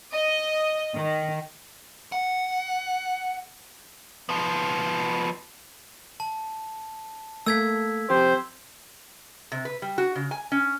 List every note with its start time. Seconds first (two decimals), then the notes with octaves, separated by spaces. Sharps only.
0.14 D#5
0.95 D#3
2.12 F#5
4.29 F3 B3
6.20 A5
7.46 A3 A#3 E6 G#6 B6
8.10 F2 G4 C5
9.52 C3
9.65 B4
9.82 G3
9.98 F#4
10.15 C#3
10.31 G#5
10.52 C#4